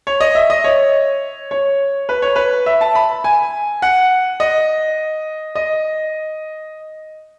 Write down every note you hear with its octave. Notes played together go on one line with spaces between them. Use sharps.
C#5
D#5
E5
D#5
C#5
C#5
B4
C#5
B4
E5
A5
B5
G#5
F#5
D#5
D#5